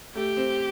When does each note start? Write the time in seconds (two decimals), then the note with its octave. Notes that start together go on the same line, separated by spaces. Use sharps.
0.15 A3 G4
0.37 C4